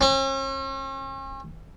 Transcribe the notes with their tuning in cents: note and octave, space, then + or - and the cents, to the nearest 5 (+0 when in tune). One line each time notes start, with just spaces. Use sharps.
C#4 -45